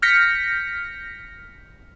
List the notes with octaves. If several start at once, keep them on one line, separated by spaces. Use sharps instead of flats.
F6 G6 A#6 B6 C#7